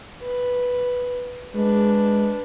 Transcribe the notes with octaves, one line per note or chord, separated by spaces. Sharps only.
B4
G#3 D4 B4